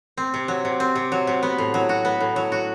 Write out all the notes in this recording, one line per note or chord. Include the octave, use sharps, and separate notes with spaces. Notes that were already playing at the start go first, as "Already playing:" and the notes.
C4
C3
F#3
C3
C4
C3
F#3
C3
B3
A2
F#3
F#4
B3
A2
F#3
F#4